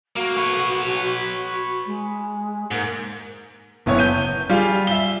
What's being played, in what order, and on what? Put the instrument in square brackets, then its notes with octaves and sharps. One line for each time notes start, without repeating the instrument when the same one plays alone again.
[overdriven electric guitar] A#3 [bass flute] F#4
[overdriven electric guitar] B4 C#5
[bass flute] G#3
[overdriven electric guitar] G#2 [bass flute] A#3
[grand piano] F#1 B3 E4 C#5
G6 D#7
G3 F4 G#4 F5
E5 G7